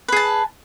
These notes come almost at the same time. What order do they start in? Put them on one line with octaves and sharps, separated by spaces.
B4 G#4 A5